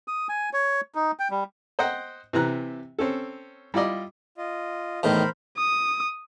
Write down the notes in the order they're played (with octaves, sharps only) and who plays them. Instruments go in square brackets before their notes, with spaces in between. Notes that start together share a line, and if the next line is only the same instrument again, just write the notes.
[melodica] D#6
G#5
C#5
D#4
G5
G3
[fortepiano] C5 D#5 F#5 G5
C3 E3 A#5 F#6
C4 C#4 A4
G3 E4 F4 D5 D#5
[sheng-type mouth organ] F4 D#5
[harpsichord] E2 A2 D#3 [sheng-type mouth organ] A#4 C5 B5
[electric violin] D#6